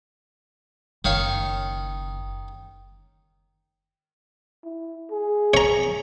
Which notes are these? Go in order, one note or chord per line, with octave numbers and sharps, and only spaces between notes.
F#1 D#3 C#5 F5
E4
G#4
C#5 A#5